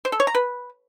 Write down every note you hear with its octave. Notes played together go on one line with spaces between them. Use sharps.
C5
A4
C#5
A#5
B4